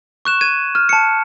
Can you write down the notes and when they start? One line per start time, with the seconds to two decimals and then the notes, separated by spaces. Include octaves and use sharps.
0.25 C#6 F#6 E7
0.41 G#6 D#7
0.75 F6
0.89 A5 C#7